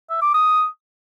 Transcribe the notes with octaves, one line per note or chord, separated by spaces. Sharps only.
E5
D6
D#6